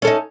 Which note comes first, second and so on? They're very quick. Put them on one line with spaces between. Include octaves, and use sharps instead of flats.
C#4 A4 D#4